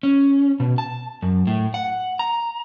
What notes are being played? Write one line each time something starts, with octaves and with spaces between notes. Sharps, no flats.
C#4
B2
A5
F#2
A2
F#5
A#5